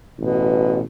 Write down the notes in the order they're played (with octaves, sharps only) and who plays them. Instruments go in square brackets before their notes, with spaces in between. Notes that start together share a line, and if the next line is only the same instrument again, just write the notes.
[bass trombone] A1 [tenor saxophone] B2